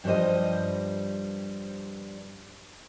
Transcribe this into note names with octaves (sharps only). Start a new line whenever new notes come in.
G2 F3 G3 C5 D#5